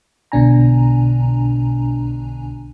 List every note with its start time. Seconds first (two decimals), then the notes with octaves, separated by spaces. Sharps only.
0.32 B1 B2 D3 D4 G#5 A#5